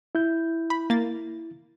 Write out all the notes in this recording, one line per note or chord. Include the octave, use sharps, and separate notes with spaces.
E4 G6
B5
A#3 A6